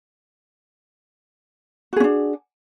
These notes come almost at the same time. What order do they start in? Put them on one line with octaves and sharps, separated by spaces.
F#4 G#4 C#4 D4